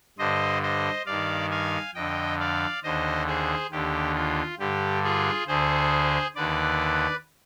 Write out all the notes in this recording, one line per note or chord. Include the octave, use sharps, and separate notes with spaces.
G2 D3 C5 D#5
C5 D#5
G2 D#3 D5 F5
F5 G#5
F2 D3 D#5 G5
D5 F5
D#2 D3 C5 D#5
G#4 C5
D#2 D3 G4
F4
G2 D3 G4
F4 G#4
D2 D3 G#4 C5
D#2 D3 B4 D5